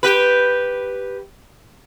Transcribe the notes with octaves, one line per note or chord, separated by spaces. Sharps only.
G4 B4